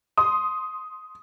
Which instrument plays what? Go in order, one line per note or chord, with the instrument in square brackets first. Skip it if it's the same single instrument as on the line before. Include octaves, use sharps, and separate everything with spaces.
[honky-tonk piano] C6 D#6